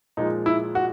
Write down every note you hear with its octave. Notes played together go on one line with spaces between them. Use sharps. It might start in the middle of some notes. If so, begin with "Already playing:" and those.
A#2 F3 G#3 D#4
E4
F#4